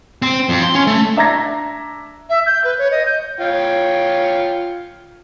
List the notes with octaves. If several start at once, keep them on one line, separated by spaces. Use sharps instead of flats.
C4
F2
C6
C#4
A3
D4 E5 A#5 G#6 A#6
E5
G6
B4
C#5
D#5
G6
F4 C#5 G5